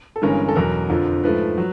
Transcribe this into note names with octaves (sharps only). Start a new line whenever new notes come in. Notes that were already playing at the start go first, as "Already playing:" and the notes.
A4
G1 G2 E3 G#3 C#4 A#4
A4
E2 B2 F#3 A#4
F2 D3 F3
G#2 F3 A3 B4
F#3